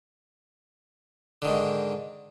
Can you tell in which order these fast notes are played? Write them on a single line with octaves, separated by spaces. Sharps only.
D3 D#3 G#2